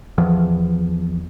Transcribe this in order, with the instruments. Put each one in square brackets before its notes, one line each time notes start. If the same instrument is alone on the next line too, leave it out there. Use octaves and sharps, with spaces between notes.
[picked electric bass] E2 F3